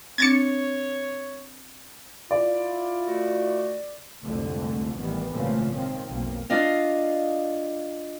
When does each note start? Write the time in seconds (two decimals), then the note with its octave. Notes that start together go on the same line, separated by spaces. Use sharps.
0.18 C4 D4 C#5 G#6 A6 C#7
2.31 E4 F4 D5
3.07 D#3 A3 F#4
4.24 C2 F2 G#2 D3 A3
4.97 A1 D#3 E3 G3 B3
5.33 G#1 A#2 C#3 E3 F3 A3
5.74 D#3 F3 C4
6.08 B1 F2 A#3
6.50 D4 F4 D#5 F5